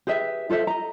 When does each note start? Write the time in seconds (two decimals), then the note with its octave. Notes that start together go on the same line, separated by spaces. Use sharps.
0.07 G4 G#4 B4 E5
0.50 F4 A4 C5 E5
0.67 D#5 A#5